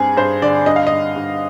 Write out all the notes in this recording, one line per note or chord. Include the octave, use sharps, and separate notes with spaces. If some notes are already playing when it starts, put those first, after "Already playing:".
Already playing: G2 C4 G#4
G2 C5
D3 D5
G2 D#5
F5
D#5
G2
G2